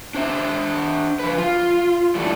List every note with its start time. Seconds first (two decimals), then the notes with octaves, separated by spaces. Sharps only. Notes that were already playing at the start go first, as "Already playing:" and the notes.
0.15 D4 C5 E5
1.19 F3 B4
1.38 F4
2.15 E3 G3 A3 D4